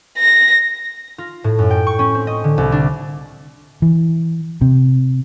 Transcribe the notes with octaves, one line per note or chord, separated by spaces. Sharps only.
A#6
F4
A2
F#2
G5
C#6
C#4
C4
D#5
D3
C2
D4
E3
C3